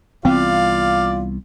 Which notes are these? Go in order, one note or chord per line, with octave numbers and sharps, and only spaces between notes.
C2 E3 B3 C4 F4 D5 F5